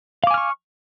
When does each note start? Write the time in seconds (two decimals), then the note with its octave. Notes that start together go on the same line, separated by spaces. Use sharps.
0.24 F5
0.27 D6
0.31 G#5
0.34 F6
0.38 C#6